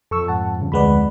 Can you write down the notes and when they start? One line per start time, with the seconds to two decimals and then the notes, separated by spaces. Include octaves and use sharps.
0.11 F2 A4 C#6 E6
0.28 G#2 F#5 A5
0.58 G2 C#3
0.72 D2 G#3 B4 D5 F#5 B5